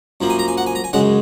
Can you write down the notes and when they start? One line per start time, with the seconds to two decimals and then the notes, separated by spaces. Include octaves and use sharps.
0.21 F#2 F3 A#3
0.30 G#5
0.39 A#5
0.48 G#5
0.57 F#5
0.66 G#5
0.75 A#5
0.84 G#5
0.93 F#2 C#3 G#3 F#5